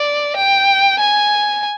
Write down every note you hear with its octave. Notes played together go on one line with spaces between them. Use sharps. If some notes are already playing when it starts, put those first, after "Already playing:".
Already playing: D5
G5
G#5